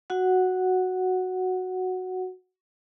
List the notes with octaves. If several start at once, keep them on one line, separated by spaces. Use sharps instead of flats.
F#4 F#5